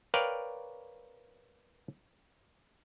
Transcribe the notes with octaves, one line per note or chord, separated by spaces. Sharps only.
A#4 B4 C#5 D5 F5 G5